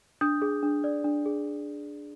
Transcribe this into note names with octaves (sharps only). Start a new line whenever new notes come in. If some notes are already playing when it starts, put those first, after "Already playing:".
D4 D#6 G6
G#4
D4
D5
D4
G#4